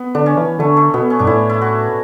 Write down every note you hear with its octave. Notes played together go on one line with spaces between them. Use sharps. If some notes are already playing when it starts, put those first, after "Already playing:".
Already playing: B3
D3 D4
C#4
E3
D3 A3
A3
B2 B3
C#4
G2 D4
A2 E4
E4
F#4